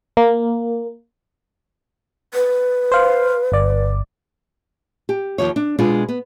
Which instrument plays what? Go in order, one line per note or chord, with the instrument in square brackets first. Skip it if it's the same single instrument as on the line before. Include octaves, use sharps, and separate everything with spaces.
[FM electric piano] A#3
[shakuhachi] B4
[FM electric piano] C5 F5
G1 D5
[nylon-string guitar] G4
D#2 G#2 F3 C#5
D4
B2 G#3 D4 F4
B3